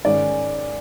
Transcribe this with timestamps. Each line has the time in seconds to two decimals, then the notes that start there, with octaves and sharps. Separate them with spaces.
0.05 G#2 D#3 G#3 C#4 D5